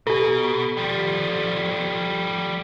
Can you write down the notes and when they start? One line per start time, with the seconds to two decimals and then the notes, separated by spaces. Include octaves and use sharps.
0.07 B2 G4 A4
0.77 F3 G3